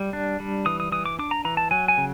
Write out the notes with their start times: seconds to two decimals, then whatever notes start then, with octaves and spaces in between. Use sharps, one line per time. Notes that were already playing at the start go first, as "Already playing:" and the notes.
Already playing: G3
0.13 D4
0.40 G3
0.66 E3 D#6
0.80 D#6
0.92 E3 D#6
1.06 D6
1.19 D4 D6
1.31 A#5
1.45 E3 A#5
1.57 A5
1.71 F#3 G#5
1.88 G#5
1.98 C#3